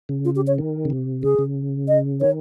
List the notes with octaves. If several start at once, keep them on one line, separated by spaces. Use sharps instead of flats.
C#3
F4
G4
C#5
D#3
C#3
C3
C#3 G#4
C#3
D#5
D#3 C#5